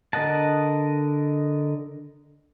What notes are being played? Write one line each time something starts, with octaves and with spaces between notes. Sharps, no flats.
D3 A#4 D#5 F#5 A5